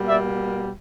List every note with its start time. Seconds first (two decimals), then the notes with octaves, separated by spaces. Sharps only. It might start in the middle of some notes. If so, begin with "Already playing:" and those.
Already playing: B2 G3 A#3
0.08 D5 E5